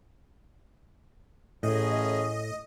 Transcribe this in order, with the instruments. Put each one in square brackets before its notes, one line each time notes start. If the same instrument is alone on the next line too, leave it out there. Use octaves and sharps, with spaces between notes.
[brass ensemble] A1 C#4 G#4 [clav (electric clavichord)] A2 [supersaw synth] D#5